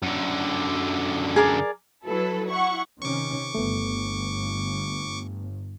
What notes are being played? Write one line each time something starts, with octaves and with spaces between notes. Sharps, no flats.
F#2 D3
G#4 A#4 D5
F#3 E4 A4 B4
E4 F#5 C#6
C3 D#3 C#4 C#6 D6
G1 A3 B3